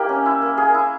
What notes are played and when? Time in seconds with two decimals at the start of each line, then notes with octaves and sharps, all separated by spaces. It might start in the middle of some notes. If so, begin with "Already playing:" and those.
Already playing: A#3 D#4 E4 G4
0.09 C#4
0.26 E4
0.42 A#3
0.58 A#3 G#4
0.74 E4